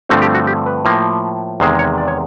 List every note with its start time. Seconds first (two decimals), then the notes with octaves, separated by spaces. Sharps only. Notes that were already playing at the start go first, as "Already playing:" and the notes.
0.09 G2 D3 F3 A3 C4 F#4
0.22 G4
0.34 F#4
0.47 G4
0.66 B4
0.85 A2 F3 A#3
1.60 E2 C3 D#3 G#3 C5
1.79 C#5
1.98 D5
2.08 C#5